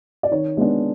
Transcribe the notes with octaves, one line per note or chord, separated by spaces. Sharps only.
D5
D#3 C#5
G#3 B3 D4